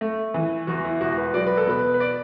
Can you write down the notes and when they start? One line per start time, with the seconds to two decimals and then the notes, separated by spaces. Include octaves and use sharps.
0.01 A3
0.34 E3
0.67 E2 F#4
0.85 E4
1.01 E1 F#4
1.18 B4
1.34 F#3 D5
1.46 B4
1.57 A4
1.67 B2 B4
1.94 B4
2.00 D5